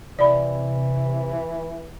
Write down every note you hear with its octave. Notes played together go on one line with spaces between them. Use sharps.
C3 E3 D5 B5